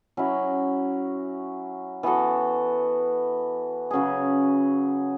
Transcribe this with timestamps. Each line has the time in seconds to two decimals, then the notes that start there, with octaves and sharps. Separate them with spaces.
0.17 F#3 C#4 E4
2.03 E3 B3 F#4 A4
3.91 C#3 F#3 C#4 G#4